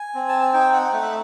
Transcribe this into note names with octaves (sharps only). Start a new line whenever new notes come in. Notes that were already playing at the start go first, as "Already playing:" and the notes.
Already playing: G#5
C4
A5
G#5
D#4 G5
F#5
A3 F#5
E5